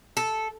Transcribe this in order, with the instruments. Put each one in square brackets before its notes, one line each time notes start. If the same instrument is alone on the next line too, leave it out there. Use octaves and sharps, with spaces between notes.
[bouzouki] A4